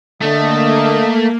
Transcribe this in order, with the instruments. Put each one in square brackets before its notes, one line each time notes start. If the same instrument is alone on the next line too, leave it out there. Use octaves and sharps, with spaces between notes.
[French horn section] D3 [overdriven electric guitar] A3 [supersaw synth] A#3 [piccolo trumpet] D#5